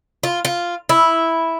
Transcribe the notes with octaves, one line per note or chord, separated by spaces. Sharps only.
F4
F4
E4